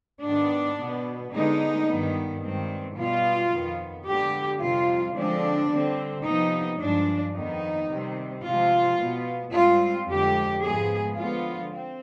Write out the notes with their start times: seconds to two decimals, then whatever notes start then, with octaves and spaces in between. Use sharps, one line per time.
0.23 G#2 D#3 B3 D4
0.78 B2 B3
1.33 D3 G#3 B3 D#4
1.87 G2 D#3 B3
2.42 G2 D#3 G#3 C4
2.97 B2 G3 B3 F4
3.52 F2 D#3 B3
4.06 D3 G#3 B3 G4
4.61 F2 C3 G3 F4
5.15 D3 F3 G#3 C4 D4
5.70 D3 G3 C4
6.26 C3 F3 B3 D#4
6.80 G2 F3 G#3 D4
7.34 F2 D#3 B3 D#4
7.89 C3 D#3 G3 C4
8.44 C3 F3 G#3 F4
8.99 B2 B3
9.53 G#2 G3 C4 F4
10.08 F2 D3 G#3 G4
10.62 G#2 F3 G#3 B3 G#4
11.17 D3 F3 G#3 B3 F4
11.72 C4